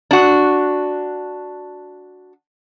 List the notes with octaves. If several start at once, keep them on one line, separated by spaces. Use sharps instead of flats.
D4 F#4